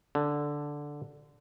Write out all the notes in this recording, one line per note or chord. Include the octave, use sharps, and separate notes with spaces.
D3